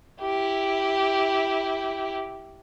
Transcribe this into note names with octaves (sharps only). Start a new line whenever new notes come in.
E4 G4